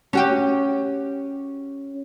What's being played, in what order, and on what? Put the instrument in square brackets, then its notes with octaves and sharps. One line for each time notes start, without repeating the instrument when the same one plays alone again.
[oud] C#4 F#4 G4